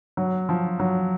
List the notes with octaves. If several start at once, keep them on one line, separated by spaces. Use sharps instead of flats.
F#3
F3
F#3